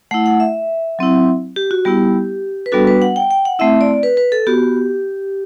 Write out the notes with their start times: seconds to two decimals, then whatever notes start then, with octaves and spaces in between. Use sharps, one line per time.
0.11 A3 E4 F#5
0.26 F#5
0.40 E5
0.99 F#3 C4 E4
1.56 G4
1.71 F#4
1.85 G3 B3 E4 G4
2.66 B4
2.72 G3 B3 D4 F#4 A4
2.87 B4
3.02 F#5
3.16 G5
3.31 G5
3.45 F#5
3.59 A3 C4 E4 E5
3.81 D5
4.03 B4
4.17 B4
4.32 A4
4.47 B3 F#4 G4